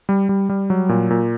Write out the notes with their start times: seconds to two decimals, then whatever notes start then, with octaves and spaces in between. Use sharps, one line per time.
0.09 G3
0.29 G3
0.49 G3
0.70 F#3
0.89 A#2
1.10 A#2